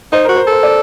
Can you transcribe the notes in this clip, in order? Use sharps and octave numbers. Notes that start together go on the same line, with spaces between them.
D#4 C5
F#4 A#4
C5
A4
C5
D5